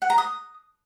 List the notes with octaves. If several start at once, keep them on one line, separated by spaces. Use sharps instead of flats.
F#5
A#5
D#6